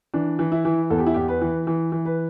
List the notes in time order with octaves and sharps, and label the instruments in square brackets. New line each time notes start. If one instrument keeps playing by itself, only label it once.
[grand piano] E3 D4
E3
E4
E3
E2 A4
G4
E4
E2 G4
B4
E3
E3
E3
B4